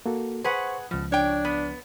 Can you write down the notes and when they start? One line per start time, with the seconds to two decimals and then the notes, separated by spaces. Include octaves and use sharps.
0.06 A#3 F#4 A4
0.44 G#4 B4 C5 F#5 C6 C#6
0.91 C#2 B2 F3
1.12 D4 C#5 G5
1.45 B3